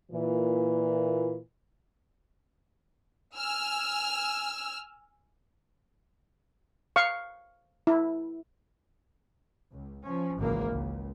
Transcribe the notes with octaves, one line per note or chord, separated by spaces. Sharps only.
A#2 E3
G#5 E6 F6
F5 C#6
E4
C#2
F3 C#4
G#1 C#2 E3 A#3
C#2